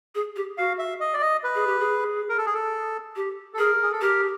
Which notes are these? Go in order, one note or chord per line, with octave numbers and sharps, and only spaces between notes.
G#4
G4
F#4 F5
E5
D#5
D5
D#5
B4
G#4
G4
G#4
A#4
A4
G#4
A4
G4
A4
G#4 A#4
G#4
A4
G4 A#4